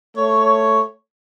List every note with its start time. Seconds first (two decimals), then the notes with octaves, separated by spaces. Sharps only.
0.16 A3 C#5